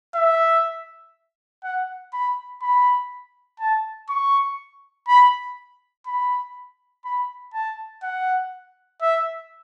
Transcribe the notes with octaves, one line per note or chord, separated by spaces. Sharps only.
E5
F#5
B5
B5
A5
C#6
B5
B5
B5
A5
F#5
E5